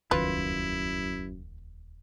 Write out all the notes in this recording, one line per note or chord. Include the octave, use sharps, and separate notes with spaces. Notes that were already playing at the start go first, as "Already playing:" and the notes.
D#1 C#2 F#2 D#3 E4 F4 B4